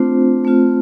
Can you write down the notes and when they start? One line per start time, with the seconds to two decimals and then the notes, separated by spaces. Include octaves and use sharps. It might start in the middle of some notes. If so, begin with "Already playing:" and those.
Already playing: A3 C4 D4 F4 C5
0.45 A3 C4 F4